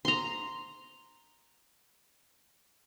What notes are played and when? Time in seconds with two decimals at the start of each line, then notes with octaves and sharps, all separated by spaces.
0.05 A#5 C6